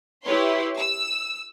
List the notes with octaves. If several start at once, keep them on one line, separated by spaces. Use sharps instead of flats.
E4 G4 B4 C#5 C6
E6